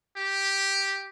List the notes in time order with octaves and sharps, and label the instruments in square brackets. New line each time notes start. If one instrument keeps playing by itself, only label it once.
[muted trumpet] G4